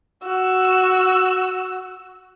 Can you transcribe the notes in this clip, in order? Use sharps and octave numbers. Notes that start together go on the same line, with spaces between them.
F#4 E6